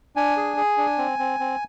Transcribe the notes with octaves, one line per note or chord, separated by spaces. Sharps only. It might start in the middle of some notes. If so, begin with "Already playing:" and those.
D4 G#5
G#4
G#4
D4
C4
C4
C4